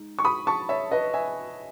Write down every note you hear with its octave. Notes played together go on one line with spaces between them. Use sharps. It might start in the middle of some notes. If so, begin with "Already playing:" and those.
Already playing: G#3 D#4
C#6
B5 D#6
A5 C#6
C#5 E5
B4 D#5
E5 G#5